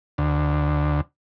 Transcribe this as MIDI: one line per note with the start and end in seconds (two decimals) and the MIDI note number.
0.18 1.01 38